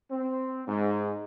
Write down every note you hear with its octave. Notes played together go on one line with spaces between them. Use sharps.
C4
G#2